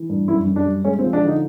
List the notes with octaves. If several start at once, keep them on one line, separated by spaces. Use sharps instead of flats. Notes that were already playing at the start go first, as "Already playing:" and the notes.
Already playing: E3
G2
F#2 E4
F#2
D4
G3
G#3 C#4
C4
F3
D4
D3 D#4